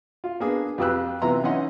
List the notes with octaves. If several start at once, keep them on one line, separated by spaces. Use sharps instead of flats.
F4
A#3 B3 D4 G#4
F2 F4 G4 B4 E6 F#6
C3 E3 B3 F4 A#5 C6
E3 C#4 D#4 D#5 F#5 C6